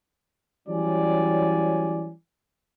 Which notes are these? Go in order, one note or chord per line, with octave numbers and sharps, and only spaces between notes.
E3 F#3 G3 C#4 D5 G#5